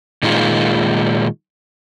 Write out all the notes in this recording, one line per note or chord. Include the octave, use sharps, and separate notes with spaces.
A#2 D#3 G#3 F4